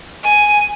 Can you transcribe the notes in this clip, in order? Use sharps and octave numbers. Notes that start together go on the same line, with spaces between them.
G#5